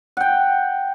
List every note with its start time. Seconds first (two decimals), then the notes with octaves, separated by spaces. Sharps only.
0.17 F#5 G5